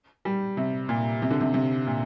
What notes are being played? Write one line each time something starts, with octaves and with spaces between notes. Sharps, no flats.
G3
C3
A#2
C3
D3
C3
C3
A#2